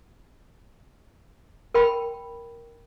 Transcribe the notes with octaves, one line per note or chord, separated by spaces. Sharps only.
A#4 G5 B5